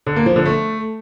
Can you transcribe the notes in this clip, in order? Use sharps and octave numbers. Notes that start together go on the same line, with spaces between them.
D3
A#3
F3
D3
A3